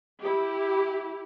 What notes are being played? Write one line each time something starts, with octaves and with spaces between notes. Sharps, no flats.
E4 G4